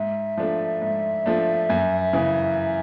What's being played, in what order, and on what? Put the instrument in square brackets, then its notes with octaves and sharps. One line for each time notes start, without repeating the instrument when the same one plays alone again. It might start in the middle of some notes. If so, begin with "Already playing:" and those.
Already playing: [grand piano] G#2 [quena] E5
[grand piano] F3 A3 D4
G#2
F3 A3 D4
F#2
C#3 E3